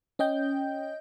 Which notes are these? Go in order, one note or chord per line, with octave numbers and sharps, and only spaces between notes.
C#4 D#5 G5 G6